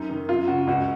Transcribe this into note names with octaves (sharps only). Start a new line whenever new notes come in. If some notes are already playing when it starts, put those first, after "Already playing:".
Already playing: F#2 D#4
D#3
F#2 F4
C#3 F#4
C#2 F#4